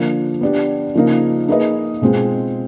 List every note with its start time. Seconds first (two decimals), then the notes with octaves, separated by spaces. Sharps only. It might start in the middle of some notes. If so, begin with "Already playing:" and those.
Already playing: D3 F3 A#3
0.41 B3 D4 G4
0.94 C#3 F3 A#3 D#4
1.48 A#3 D#4 G#4 B4 D#5
2.02 B2 G#3 C4 F4 G#4